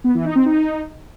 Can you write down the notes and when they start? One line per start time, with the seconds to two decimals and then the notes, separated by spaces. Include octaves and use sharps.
0.04 B3
0.15 E3
0.25 D#4
0.35 C4
0.46 D#4